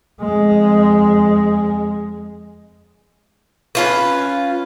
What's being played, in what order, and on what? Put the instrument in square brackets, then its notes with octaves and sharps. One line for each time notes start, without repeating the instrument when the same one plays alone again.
[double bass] F2 G#3
[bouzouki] C#4 F4 B4